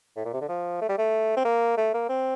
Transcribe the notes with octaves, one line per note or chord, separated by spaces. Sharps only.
A2
A#2
C3
D3
F3
A3
G3
A3
C4
A#3
A3
A#3
C4